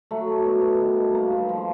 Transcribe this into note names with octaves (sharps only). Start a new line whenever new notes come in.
F#3 A3
F#3
B2
B2
D#3
G2
F#3 A#3
G2
F3